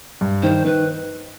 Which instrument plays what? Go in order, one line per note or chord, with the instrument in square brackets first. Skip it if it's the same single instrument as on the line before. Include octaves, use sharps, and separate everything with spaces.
[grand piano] G2
[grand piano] D#3 [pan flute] C5
[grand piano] D#3 [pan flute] B4